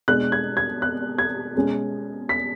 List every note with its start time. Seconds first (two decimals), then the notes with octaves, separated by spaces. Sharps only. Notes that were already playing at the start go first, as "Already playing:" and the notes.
0.08 B2 G#3 D4 F#6
0.32 G#6
0.57 G#6
0.82 F#6
1.18 G#6
1.55 B2 G#3 C#4
2.29 B6